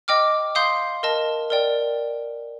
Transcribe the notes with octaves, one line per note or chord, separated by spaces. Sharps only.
D#5 G5 D6 F6
F5 C6 D#6 G6
A#4 D#5 A5
A#4 D5 G5